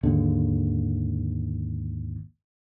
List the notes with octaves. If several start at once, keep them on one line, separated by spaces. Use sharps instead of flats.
G#1 D#2 D3